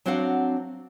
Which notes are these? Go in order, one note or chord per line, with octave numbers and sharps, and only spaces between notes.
F#3 C4 D4 F#4 F5 F#5